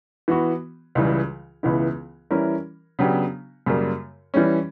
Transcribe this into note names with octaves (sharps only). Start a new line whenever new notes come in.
E3 B3 F#4
C#2 C#3 E3 G3
C#2 C#3 E3 B3 E4
E3 G3 C#4 E4 A#4
C#3 F#3 B3 D4 G4
F#2 C#3 G3 A#3
E3 G3 C#4